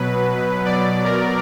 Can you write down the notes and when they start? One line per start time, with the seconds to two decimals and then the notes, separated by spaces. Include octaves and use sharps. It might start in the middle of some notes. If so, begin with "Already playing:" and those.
Already playing: B2 F#3 B4
0.65 B2 F#3 D5
1.04 A#4